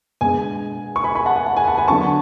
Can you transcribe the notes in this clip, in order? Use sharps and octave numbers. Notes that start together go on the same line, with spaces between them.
B2 G#3 D4 G#5
C#6
G#5 B5
G#5 B5
F#5 A5
G#5
F#5
G#5
F#5 A5
G#5 B5
D3 F#3 B3 D4 A5 C#6